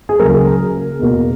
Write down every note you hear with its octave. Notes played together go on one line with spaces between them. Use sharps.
G#4
C#2 C#3 F#3 A#3 A#4
E2 B2 A#3